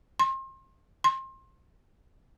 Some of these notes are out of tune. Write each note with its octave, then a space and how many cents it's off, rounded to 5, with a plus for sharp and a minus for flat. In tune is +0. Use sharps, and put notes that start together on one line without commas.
C6 +35
C6 +30